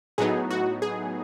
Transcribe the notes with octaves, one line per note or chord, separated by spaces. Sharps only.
A2 F#3 B3 D#4 G#4
F#4
G#4